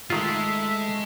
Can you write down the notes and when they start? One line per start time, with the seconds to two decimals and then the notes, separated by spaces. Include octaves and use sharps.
0.10 D#3 G#3 A3 F4 E5